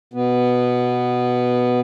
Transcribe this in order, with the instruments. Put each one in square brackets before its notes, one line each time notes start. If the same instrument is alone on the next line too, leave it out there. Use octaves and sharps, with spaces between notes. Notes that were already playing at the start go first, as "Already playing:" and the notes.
[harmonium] B2 B3